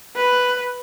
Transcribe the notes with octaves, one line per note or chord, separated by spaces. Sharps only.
B4